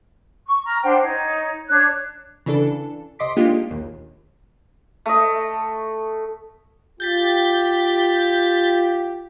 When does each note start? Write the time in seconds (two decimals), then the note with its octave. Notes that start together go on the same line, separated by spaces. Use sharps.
0.46 C#6
0.65 A#5 F6
0.83 D4 C5 F#5 G5
1.03 D#4 C#5
1.68 D4 C#5 F#6
2.46 C#3 E3 D4 A4
3.19 C2 D#5 C6 D6 B6
3.37 G#3 A#3 D4 D#4 F4 G4
3.70 A#1 D#2
5.06 A3 D#5
7.00 F4 G4 G6 A6 B6